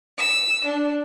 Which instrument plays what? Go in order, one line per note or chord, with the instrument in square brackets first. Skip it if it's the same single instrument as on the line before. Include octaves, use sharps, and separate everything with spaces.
[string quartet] E6
D4